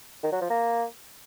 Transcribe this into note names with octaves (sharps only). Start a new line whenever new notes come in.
D#3
F#3
F3
A#3